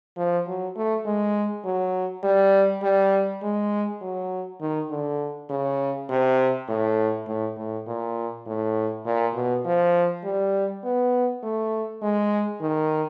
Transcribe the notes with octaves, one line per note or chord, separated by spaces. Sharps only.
F3
F#3
A3
G#3
F#3
G3
G3
G#3
F#3
D#3
D3
C#3
C3
A2
A2
A2
A#2
A2
A#2
B2
F3
G3
B3
A3
G#3
D#3